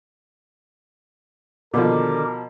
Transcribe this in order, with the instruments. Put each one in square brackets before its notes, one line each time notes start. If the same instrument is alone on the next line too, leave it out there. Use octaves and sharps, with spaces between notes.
[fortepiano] B2 F3 [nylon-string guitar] D3 D#3 G4 [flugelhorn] A#4 [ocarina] D6